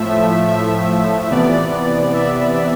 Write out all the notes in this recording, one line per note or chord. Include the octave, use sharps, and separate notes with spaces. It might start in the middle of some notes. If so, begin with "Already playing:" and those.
Already playing: A2 F3 A3 E5
E5
C3 E3 B3 D5
E5